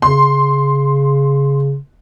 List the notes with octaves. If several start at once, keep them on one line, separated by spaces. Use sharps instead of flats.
C#3 C6